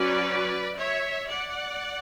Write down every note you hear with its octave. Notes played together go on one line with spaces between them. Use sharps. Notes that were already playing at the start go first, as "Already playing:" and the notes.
Already playing: F#3 C#4 B4 D5
C#5 E5
D5 F#5